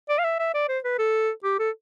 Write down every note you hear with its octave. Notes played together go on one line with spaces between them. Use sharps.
D5
F5
E5
E5
D5
C5
B4
A4
G4
A4